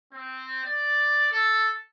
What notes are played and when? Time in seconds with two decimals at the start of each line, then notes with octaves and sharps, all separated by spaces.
0.12 C4
0.64 D5
1.31 A4